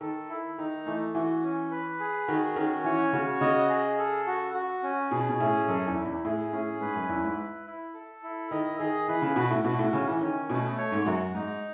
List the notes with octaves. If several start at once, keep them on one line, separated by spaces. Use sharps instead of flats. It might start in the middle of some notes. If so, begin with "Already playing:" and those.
D#3 A4
E4
D#3 D#4
E3 A3
E3 F#4
C#4
B4
G#4
D#3 F#4
D#3 C#4
E3 C#5
C#3 F#4
C#3 D#5
G#4
A4
F#4
F#4
C#4
B2 G#4
B2
A2 C#4
F#2 A4
E2
E4
E2
A2 G#4
A2 C#4
G#2 B4
F#2
E2 E4
G#2
B4
E4
A4
E4
D#3 D#5
D#3 G#4
E3 B4
C#3
B2 F#4
A2
B2 F#4
A2
C#3 C#4
E3
D#3 C#4
B2 A3
C#5
G#2
F#2 F#4
G#2 D#4